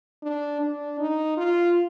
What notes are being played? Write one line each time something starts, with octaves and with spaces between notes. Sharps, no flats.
D4
D4
D#4
F4